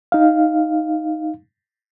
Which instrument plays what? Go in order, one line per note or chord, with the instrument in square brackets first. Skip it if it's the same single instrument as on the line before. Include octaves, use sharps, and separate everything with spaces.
[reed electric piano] D#4 F5